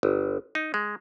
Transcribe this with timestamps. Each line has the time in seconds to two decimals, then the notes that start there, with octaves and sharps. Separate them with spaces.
0.03 G1
0.55 D#4
0.74 G#3